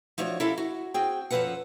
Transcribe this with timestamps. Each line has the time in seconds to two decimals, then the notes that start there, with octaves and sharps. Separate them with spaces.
0.18 F3 A3 D4 F#4 C#5
0.40 E4 G4 A4 A#4 E5 F5
0.58 F#4
0.94 C4 F#4 G#4 G5
1.31 F#2 F3 E4 A4 B4 F#5